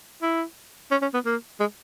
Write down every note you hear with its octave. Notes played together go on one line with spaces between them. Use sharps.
E4
C#4
C#4
B3
A#3
G#3